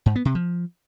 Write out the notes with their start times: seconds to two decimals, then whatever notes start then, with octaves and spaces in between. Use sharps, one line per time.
0.06 G#2
0.16 B3
0.25 C3
0.35 F3